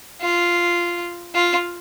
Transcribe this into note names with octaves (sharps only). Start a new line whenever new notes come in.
F4
F4